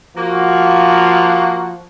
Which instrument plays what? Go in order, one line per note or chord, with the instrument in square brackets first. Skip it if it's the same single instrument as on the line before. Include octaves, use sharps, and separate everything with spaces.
[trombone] F3 [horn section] A#3 F#4